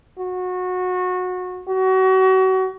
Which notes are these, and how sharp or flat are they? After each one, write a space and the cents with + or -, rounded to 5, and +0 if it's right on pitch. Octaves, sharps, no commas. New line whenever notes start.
F#4 -20
F#4 +30